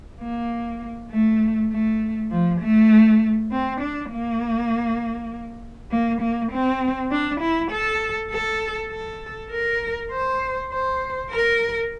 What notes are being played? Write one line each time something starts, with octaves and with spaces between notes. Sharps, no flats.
A#3
A3
A3
F3
A3
C4
D4
A#3
A#3
A#3
C4
D4
E4
A4
A4
A4
A#4
C5
C5
A#4